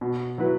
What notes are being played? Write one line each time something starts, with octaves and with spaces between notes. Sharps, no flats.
B2
F#3 E4 B4